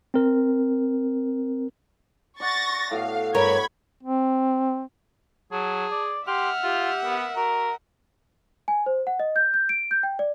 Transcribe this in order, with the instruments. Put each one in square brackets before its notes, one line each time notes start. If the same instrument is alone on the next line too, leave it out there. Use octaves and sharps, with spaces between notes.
[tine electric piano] C4 A#4
[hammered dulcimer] D5 F#5 [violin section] C#6 A6 A#6
[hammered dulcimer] A2 B3 F#4 [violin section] F5
[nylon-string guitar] G2 A#4 C#5 [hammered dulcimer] B4 [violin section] B5 C#6 G#6
[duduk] C4
[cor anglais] F#3 [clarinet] G#4 [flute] A5
[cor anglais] D5
[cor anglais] G4 [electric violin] E5 F#5 [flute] C6 [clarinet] F6
[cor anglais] F4 [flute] G4
[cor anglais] B3 [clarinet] A#4
[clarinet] F#4 [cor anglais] A#4 [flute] A#5
[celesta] G#5
C5
F#5
D#5
G6
G6
D7
G6
G5
D5